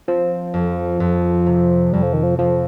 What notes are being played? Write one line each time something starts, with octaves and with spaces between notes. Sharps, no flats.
F3 C4
F2
F2
C3
F2 G3
F3
D#3
F3
F2 F3